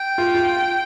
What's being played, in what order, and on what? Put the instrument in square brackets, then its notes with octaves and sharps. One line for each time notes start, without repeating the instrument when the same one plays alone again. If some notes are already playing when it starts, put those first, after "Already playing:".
Already playing: [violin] G5
[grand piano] F4
F4